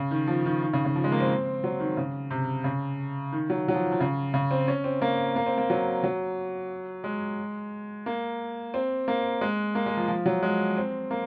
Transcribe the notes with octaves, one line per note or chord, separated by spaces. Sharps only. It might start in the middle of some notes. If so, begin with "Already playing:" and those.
Already playing: C#3
D#3
F3
D#3
D#3
C#3
C#3
F3
G#3
A#3
C4
F#3
D#3
C#3
C3
C#3
D#3
F#3
F#3
F3
F3
C#3
C#3
C4
C#4
C4
A#3
A#3
C4
A#3
F#3
F#3
G#3
A#3
C4
A#3
G#3
A#3
G#3
F3
F3
F#3
G#3
C4
A#3